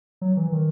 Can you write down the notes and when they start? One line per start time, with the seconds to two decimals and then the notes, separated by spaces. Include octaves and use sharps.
0.21 F#3
0.37 E3
0.52 D#3